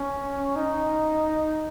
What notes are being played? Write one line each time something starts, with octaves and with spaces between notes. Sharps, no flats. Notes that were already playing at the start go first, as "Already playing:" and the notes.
Already playing: C#4
D#4